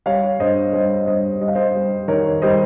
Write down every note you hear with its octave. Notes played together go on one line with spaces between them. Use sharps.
G3 C#5 F5
G2 C5 D#5
G3 C5 D#5
G3 C5 D#5
G3 D#5
F5
C5 D#5
G3
D#3 A#4 C#5
G3 C5 D#5